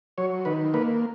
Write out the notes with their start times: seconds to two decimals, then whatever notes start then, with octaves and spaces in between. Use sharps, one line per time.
0.18 F#3 C#5
0.45 D#3 B4
0.74 A#3 B4